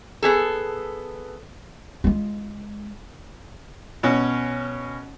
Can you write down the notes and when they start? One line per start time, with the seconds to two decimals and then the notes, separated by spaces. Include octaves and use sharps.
0.23 B3 G#4 A4
2.04 G#3 F4
4.03 B2 C#4